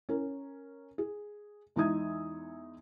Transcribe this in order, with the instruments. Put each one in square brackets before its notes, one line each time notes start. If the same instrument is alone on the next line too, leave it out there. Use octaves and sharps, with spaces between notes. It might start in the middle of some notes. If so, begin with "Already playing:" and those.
[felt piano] C#4 A#4
G#4
E2 G#3 D#4 E5 D#6 G#6